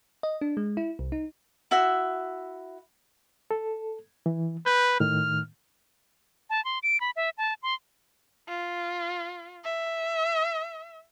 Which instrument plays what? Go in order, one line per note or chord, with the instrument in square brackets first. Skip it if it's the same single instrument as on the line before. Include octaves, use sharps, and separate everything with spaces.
[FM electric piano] D#5
D4
G#3
E4
C2
D#4
[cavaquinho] E4 F#4 E5
[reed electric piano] A4
E3
[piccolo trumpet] B4 [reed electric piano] G6
[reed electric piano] A2 D#3 [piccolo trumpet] F6
[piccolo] A5
C6
D7
B5
E5
A5
C6
[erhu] F4
E5